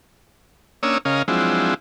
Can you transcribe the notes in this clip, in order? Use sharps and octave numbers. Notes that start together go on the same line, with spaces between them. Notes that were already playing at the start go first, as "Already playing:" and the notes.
A#3 C#4 D4 C#5 D#6 E6
C#3 C#4 A#4 D#5 F5
F3 F#3 G#3 C4 D4 E4